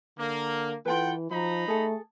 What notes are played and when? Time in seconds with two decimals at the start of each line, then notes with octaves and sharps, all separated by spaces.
0.18 D3 A#3
0.85 E3 F4 A4 B4 F#5 G5
1.31 F3 D#4 F#4 A#5 B5
1.68 A3 G#4 A4